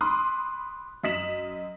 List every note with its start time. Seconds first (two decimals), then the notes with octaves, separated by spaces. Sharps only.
0.01 B5 C6 D6 D#6 F#6
1.04 F#2 D#5 D#6 B6 E7 F#7